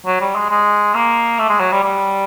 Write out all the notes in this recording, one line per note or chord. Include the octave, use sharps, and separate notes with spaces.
F#3
G3
G#3
G#3
A#3
A3
G#3
F#3
G3
G3